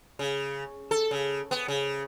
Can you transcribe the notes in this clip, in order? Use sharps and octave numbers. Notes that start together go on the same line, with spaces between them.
C#3
A4
C#3
B3
C#3